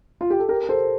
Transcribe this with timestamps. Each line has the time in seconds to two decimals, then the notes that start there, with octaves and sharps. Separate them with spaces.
0.21 F4
0.30 G4
0.39 A4
0.49 G4 A#4
0.69 A4 C5